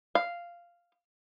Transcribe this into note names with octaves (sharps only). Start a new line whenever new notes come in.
F5